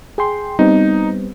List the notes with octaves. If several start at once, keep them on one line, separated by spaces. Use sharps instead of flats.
G#4 G5 C6
G3 B3 C4 D#4